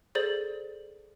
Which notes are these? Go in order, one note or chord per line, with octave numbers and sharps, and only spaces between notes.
G#4 A4 C5 D5 A6 F#7